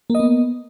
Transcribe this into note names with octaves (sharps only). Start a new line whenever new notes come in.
A#3 B3 D#5